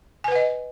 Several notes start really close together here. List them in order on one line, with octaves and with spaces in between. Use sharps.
G#5 B4 F#5 D#5